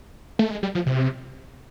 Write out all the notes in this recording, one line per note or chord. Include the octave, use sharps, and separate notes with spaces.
A3
G#3
G3
F3
C3